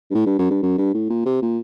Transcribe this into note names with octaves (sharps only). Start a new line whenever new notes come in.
G2
A2
G2
F#2
G2
F#2
G2
A2
A#2
C3
A#2